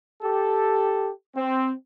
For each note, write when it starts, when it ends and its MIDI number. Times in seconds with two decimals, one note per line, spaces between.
0.22 1.10 67
0.22 1.10 69
1.36 1.73 60